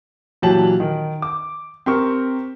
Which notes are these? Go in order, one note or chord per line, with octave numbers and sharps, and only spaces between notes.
A#2 E3 F#3 G4 A5 F#7
D#3
D6
C4 G4 A#4 C#6